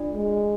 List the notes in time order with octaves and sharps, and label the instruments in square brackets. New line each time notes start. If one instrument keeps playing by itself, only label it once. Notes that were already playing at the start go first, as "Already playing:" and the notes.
Already playing: [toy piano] D4 F4 A4 D5
[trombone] G#3